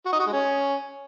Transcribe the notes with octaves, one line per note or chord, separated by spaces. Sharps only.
F#4
D#4
F#4
G#3
C#4